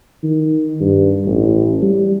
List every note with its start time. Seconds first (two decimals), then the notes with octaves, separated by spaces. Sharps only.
0.24 D#3
0.80 G2
1.26 A1
1.82 G3